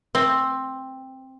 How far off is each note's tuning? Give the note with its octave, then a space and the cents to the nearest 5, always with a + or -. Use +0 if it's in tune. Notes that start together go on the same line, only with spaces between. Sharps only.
C4 +10